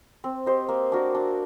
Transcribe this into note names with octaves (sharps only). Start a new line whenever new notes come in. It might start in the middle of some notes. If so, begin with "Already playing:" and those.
C4
G4 C5 D#5
A#3
D4 F#4 A#4
D4